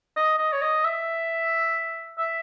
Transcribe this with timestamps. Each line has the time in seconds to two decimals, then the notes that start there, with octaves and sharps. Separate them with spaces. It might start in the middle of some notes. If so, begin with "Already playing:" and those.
0.16 D#5
0.38 D#5
0.53 C#5
0.62 D#5
0.84 E5
2.18 E5